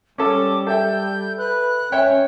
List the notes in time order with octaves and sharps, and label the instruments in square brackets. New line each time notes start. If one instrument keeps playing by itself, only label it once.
[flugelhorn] G3 [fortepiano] C#4 A4 [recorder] D6
[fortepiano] A4 E5 G5 [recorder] G6
[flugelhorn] B4 [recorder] F#6
[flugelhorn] C#4 [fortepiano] C#5 E5 G5